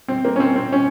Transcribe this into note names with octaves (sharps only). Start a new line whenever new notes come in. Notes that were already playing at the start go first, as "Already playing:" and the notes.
C4
A#3
C#4
C4
C4
C#4